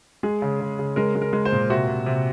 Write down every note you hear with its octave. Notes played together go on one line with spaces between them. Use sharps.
G#3 G#4
C#3
C#3
C#3
G#3 A#4
G#3
A#4
G#3
C5
A#2
C3 F#4
C3
C3